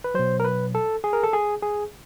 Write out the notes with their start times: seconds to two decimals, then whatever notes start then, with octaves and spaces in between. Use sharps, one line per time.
0.04 B4
0.14 B2 F#3 C5
0.40 A#4
0.44 B4
0.75 A4
1.04 G#4
1.13 A#4
1.24 A4
1.33 G#4
1.62 G#4